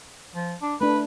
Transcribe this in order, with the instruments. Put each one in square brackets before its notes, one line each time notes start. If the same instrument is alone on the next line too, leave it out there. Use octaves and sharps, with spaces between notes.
[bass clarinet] F3
D4
[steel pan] A3 D4 [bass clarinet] B4